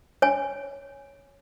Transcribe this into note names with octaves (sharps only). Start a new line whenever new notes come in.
C#5 G#5